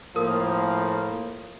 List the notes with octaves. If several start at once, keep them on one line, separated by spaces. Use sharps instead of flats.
A2 F3 A#3 A#4 D#6